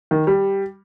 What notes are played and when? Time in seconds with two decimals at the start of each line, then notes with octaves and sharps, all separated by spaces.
0.11 D#3
0.27 G3